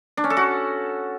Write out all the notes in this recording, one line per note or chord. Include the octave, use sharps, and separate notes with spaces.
D4
C#4
A4
F#4